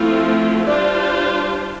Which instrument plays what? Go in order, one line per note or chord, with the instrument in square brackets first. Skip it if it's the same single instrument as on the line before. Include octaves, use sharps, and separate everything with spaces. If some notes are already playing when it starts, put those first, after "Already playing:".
Already playing: [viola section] F3 A3 C4 F4 [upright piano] E4
[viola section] G3 D4 F4 C5 [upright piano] D5